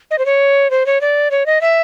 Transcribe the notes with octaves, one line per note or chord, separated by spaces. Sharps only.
D#5
C5
C#5
C5
C#5
D5
C#5
D#5
E5